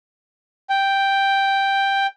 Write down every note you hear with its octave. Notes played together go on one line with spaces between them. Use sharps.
G5